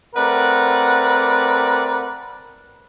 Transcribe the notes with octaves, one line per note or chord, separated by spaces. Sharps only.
A3 C4 A#4 B4 D5 F#5